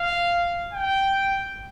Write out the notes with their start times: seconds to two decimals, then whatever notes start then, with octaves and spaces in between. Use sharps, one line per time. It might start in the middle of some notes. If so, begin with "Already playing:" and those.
Already playing: F5
0.73 G5